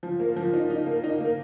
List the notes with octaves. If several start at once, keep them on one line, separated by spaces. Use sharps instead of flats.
F3
A#3
F3
D#4
D#4
A#3
D#4
A#3